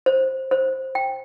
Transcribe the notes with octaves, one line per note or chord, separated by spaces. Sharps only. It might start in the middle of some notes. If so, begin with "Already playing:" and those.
C5
C5
G5